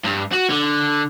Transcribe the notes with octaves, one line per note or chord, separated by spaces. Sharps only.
G2
F#4
D3